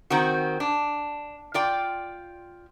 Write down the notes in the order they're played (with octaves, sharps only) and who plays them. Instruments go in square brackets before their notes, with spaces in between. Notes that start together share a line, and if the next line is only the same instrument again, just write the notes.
[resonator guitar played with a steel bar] D#3 C4 F#4
D4
F4 D5 G5